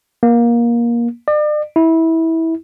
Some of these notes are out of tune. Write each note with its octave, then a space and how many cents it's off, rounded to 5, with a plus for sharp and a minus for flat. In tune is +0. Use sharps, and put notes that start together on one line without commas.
A#3 +20
D5 +40
E4 -20